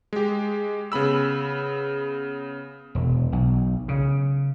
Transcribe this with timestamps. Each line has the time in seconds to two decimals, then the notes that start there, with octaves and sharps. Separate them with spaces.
0.13 G#3 G4
0.92 C#3 B3 B5 E6
2.95 E1
3.32 B1
3.88 C#3